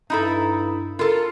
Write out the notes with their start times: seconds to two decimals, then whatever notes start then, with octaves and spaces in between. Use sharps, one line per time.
0.10 G2 D#4 E4 A4
0.99 F4 A4 A#4